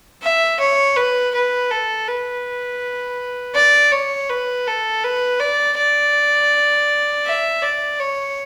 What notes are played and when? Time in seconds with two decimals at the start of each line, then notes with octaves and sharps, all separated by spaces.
0.22 E5
0.60 C#5
0.96 B4
1.34 B4
1.71 A4
2.08 B4
3.55 D5
3.92 C#5
4.30 B4
4.67 A4
5.03 B4
5.40 D5
5.77 D5
7.25 E5
7.62 D5
7.99 C#5